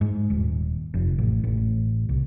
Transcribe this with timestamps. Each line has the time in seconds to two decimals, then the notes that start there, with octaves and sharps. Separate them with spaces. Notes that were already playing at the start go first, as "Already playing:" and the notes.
0.01 G#2
0.30 D#1
0.94 F1
1.18 A1
1.44 A1
2.09 C2